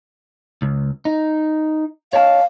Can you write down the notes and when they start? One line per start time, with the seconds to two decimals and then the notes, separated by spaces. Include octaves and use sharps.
0.62 C#2
1.05 D#4
2.13 C#5 D#5 F5 A5